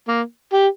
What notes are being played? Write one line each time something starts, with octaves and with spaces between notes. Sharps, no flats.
A#3
G4